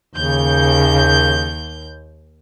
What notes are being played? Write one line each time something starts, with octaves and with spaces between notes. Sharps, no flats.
D#2 C#3 G6